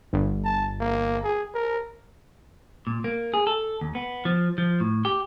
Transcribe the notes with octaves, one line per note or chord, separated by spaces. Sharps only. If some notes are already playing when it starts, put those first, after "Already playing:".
G1
A5
A#3
G#4
A#4
A#2
A#3
G#4
A4
D#2
B3
F3
F3
A2
G4